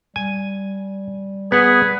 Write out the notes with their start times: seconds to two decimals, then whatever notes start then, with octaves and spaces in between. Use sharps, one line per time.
0.16 G3 G#5
1.52 B3 G#4 B4 F#5